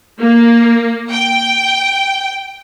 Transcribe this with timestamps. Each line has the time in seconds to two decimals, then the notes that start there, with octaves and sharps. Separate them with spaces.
0.19 A#3
1.11 G5